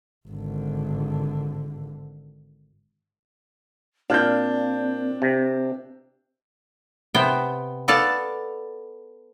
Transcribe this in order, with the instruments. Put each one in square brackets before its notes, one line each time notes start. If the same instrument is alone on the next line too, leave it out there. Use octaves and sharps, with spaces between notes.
[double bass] G#1 D3
[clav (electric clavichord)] A#2 F5 [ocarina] C4 [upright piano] D4 G6
[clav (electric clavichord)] C3
[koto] C3 B3 C5 G5
B3 A4 D5 F5 A5